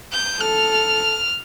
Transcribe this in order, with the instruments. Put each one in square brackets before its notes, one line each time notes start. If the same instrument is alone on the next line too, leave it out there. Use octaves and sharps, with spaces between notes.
[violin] G6
[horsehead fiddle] A4 [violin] F6